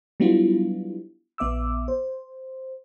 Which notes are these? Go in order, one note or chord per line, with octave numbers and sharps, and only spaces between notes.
F#3 G3 B3 D4 E4 F4
A#1 B3 E5 D6 E6
C5